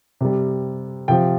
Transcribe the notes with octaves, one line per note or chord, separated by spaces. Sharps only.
C3 G3
C3 F3 G5